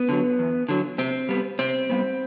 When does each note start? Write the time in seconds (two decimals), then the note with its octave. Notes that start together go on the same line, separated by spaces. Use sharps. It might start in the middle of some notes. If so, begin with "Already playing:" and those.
Already playing: B3
0.09 D3 F#3
0.39 E2
0.69 D3 F#3
0.98 C3 C4
1.29 G3 B3
1.59 C3 C4
1.90 G3 B3